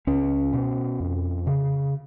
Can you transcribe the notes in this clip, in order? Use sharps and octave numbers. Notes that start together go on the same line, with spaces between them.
C#2 C#4
B2
F2
C#3